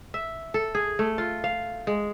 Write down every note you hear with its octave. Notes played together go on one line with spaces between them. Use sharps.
E5
A4
G#4
A3
F4
F5
G#3